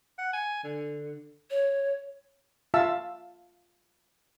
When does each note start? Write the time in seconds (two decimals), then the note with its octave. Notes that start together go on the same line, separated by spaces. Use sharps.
0.18 F#5
0.33 G#5
0.64 D3
1.50 C#5
2.74 F4 E5 F5 A5 E6